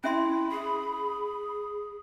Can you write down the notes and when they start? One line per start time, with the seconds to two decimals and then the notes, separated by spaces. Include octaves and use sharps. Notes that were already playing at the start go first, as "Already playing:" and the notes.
0.04 C#4 E4 E5 B5 C6
0.51 G#4